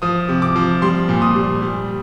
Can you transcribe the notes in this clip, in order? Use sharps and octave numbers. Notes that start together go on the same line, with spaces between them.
F3 D#6
C3
D6
F3
G3 C6
A#2
D#6
G3
G3